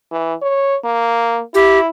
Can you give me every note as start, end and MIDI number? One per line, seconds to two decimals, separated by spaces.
0.11 0.34 52
0.42 0.76 73
0.84 1.41 58
1.55 1.89 64
1.55 1.79 67